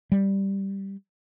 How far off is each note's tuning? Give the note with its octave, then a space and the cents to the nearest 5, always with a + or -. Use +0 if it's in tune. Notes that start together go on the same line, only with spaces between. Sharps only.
G3 +0